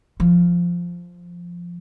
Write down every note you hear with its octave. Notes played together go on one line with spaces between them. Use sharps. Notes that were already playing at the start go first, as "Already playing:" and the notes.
F3